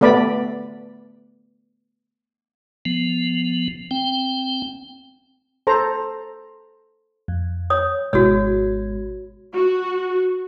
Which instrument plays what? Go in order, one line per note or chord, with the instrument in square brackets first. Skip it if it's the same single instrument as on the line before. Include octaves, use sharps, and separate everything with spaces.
[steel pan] A3 B3 D5 B5
[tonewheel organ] F3 B3
C4 G5
[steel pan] A4 C5 A#5
[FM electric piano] F2
[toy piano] C#5 D#6
[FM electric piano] G#1 B2 G#3 [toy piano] F#4 C#5
[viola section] F#4